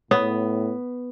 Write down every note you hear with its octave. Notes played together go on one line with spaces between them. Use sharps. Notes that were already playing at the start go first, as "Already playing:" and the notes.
A2 B3 C#5 D#6